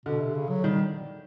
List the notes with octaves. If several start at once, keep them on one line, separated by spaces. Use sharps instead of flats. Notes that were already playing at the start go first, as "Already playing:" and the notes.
B2 D3
C3
C#3
F#3
D#3 G3